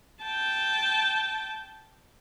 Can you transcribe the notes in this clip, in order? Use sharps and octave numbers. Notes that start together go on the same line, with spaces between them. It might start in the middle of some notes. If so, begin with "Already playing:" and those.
G5 A5